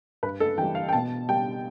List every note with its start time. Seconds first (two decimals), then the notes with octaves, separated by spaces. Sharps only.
0.23 G2 B4
0.40 A4
0.58 E3 G5
0.62 G3
0.75 F5
0.89 G5
0.93 B2 A5
1.29 G3 G5